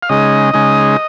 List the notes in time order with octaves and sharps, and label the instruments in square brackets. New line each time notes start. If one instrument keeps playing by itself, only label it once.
[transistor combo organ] F5
C#3 G#3 D#4 D#5
C#3 G#3 D#4